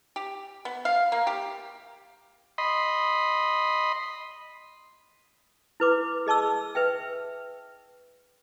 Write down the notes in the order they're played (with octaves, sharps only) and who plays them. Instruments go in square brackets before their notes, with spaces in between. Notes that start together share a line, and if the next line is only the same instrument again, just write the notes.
[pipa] G4
B3
F5
A#3
G4
[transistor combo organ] D#5 B5 C6
[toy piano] E4 B4 D6
G#4 D#5 A5 C#6 E6
B4 E5 G5